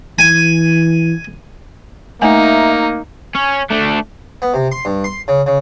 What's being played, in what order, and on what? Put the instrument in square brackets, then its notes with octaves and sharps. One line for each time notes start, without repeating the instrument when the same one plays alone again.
[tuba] E3 [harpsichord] G#5
[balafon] A3 G#5 [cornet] A#3 [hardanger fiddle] D#4 [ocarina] E5
[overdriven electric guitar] C#4
A3 D4
[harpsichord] B3
C3
C6
G2
C6
C#3
C#3